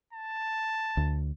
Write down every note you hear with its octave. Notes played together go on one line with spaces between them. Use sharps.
A5
D2